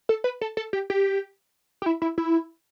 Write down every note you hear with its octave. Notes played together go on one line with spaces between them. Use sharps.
A4
B4
A4
A4
G4
G4
G4
E4
E4
E4